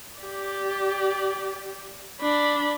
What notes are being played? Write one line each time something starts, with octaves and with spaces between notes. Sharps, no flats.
G4 D5
D4 B5